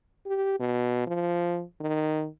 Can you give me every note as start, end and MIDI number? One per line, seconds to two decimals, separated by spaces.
0.26 0.59 67
0.60 1.05 47
1.07 1.62 53
1.80 2.27 51